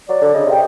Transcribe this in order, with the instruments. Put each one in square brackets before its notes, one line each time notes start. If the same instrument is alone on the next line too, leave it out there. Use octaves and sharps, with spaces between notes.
[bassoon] F#3 [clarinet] D5
[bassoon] D3 [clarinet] D5
[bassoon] C#3 [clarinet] D#5
[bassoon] C3
[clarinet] G5